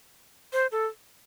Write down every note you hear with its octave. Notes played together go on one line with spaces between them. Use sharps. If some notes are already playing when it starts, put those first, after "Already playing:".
C5
A4